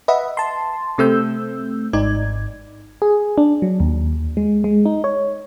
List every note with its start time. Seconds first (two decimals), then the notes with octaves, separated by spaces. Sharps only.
0.08 B4 D#5 E5 F#5
0.37 A5 C6
0.98 C3 A3 C4 E6 G6
1.93 G#1 G#2 D#4 D5 G#6
3.02 G#4
3.38 D4
3.62 F#3
3.80 D#2
4.37 G#3
4.64 G#3
4.86 D#4
5.04 C#5